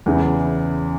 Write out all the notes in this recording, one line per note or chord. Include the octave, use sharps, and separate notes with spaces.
E2 C#3 E3